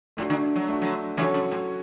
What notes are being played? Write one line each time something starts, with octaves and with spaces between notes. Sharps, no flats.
A2 A3 D4 F#4
D3
F#3
A3 D4 F#4
D3 F#3
C#3 E3 F#3 C#4 F#4 A4 C#5
C#3
A2